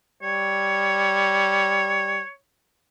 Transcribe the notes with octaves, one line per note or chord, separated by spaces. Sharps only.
G3 C#5